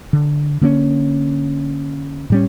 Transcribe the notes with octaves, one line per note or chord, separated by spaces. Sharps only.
D3
D3 A#3 C4 C#4
A2 G3 C#4